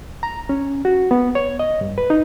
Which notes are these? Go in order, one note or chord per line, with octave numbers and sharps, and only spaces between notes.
A#5
C#4
F#4
B3
C#5
D#5
G2
B4
D#4